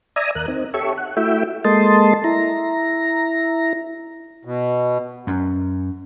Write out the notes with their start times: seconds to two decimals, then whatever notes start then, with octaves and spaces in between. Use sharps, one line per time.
0.16 D5 E5 G#5 A#5 D#6
0.35 D#2 A#4 F#6
0.48 C4 D#4
0.74 G4 A4 C#5 E5 C#6
0.98 F#5
1.17 A3 E4 F#4 E5 G5
1.64 G#3 A#3 A4 D#5 A5 C6
2.24 E4 A#5
4.45 B2
5.27 F#2